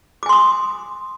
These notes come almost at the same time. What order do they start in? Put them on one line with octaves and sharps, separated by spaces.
D6 G#5 C6 D#6